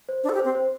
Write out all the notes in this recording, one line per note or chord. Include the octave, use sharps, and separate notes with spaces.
C5
D4 C5
A4
G4
C4 C5
C5